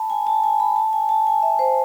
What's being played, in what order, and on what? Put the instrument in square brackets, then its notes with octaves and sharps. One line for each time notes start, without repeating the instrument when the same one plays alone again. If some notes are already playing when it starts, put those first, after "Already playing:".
Already playing: [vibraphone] A5 B5
G#5
A5
G#5
B5
A5
G#5
A5
G#5
E5
C5